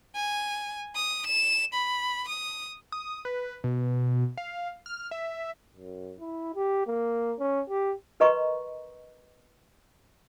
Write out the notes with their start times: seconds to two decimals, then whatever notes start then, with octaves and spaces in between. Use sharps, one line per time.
0.16 G#5
0.96 D#6
1.27 E7
1.74 B5
2.28 D#6
2.92 D#6
3.25 B4
3.64 B2
4.37 F5
4.86 F6
5.11 E5
5.76 F#2
6.20 E4
6.55 G4
6.87 A#3
7.39 C#4
7.69 G4
8.20 A#4 B4 D#5 A#5 C6 C#6